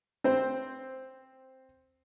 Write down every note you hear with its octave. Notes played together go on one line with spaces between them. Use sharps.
C4 C5